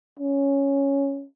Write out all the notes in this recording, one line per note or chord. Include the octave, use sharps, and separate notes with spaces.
C#4